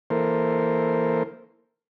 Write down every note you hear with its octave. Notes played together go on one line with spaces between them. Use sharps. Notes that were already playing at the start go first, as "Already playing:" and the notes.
E3 A#3 A4 A#4 C5